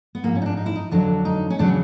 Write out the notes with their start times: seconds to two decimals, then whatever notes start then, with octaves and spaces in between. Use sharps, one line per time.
0.15 B3
0.23 G#2 F3 A#3
0.35 C#4
0.42 D#4
0.46 D4
0.57 D#4
0.66 E4
0.75 D#4
0.91 F2 D3 F#3 D4
1.25 D#4
1.50 C#4
1.59 E2 C#3 F#3 D4